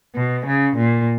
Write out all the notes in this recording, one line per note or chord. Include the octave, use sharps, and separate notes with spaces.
B2
C#3
A#2